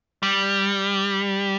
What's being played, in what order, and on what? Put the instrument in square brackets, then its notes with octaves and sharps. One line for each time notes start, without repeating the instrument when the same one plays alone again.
[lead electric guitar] G3